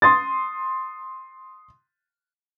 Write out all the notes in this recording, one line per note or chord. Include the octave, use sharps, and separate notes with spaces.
C6 D#6 A6